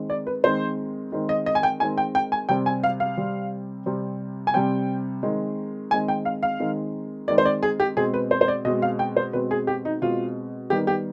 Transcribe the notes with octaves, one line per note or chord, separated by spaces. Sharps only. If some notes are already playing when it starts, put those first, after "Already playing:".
Already playing: D#3 G#3 C4
D5
B4
D#3 G#3 C4 C5
D#3 G#3 C4
D#5
D#5
G#5
G5
D#3 G#3 C4 G#5
G5
G5
G#5
C3 G3 C4 G5
G#5
F5
F5
C3 G3 C4
C3 G3 C4
G#5
C3 G3 C4 G5
D#3 G#3 C4
D#3 G#3 C4 G#5
G5
F5
F5
D#3 G#3 C4
D#3 G#3 C4 D5
C5
D5
G#4
G4
B2 G#3 C4 G#4
B4
C5
C5
D5
B2 G#3 C4 D#5
F5
G5
C5
B2 G#3 C4 B4
G#4
G4
D#4
B2 G#3 C4 F4
D#3 G3 B3 G4
G4